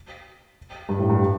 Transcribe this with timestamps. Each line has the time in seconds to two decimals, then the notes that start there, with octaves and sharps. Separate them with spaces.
0.89 G2
0.99 A2
1.10 G2